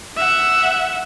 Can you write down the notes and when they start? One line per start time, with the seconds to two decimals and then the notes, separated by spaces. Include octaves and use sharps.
0.17 E5 F#5